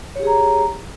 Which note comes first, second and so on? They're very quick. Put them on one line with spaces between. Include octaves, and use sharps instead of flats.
C#5 G4 G#4 A#5